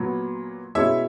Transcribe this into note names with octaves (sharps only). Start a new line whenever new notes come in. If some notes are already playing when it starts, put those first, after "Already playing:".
Already playing: A#2 F#3 B3
B2 G#3 C#4 E4 C#5 E5